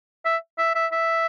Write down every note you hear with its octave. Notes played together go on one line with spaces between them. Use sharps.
E5
E5
E5
E5